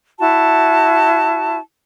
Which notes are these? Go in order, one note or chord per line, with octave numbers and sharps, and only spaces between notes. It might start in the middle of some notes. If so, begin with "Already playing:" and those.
E4 F#4 A5